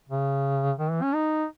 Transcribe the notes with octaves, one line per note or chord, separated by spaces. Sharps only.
C#3
D#3
E3
C#4
D#4